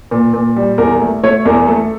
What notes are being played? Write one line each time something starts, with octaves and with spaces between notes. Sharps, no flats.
A#2
A#2
G3
E2 A#4
A3
A3 C#5
E2 A#4
A3 A4